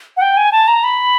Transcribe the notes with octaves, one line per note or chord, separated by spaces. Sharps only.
F#5
G5
G#5
A5
A#5
B5